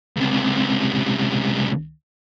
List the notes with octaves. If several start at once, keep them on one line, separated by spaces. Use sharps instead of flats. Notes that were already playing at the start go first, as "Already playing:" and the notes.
C#2 C3